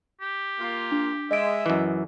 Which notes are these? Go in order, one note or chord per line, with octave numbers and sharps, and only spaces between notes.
G4
A#3 F4
D4
G#3 D#5 E5 D7
F#2 E3